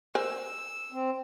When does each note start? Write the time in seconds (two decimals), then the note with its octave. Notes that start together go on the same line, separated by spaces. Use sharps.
0.15 A#4 C5 G#5 E6
0.92 C4